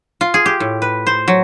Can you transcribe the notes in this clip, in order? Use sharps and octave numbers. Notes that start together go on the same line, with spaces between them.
F4
G#4
G4
A2
B4
C5
F#3